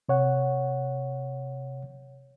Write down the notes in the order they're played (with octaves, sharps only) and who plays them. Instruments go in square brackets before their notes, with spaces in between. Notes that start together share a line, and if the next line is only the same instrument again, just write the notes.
[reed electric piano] C3 C#5 F#5